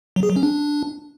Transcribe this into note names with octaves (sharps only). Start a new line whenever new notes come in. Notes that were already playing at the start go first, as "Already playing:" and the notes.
F#3
G#4
F#3
C#4
D4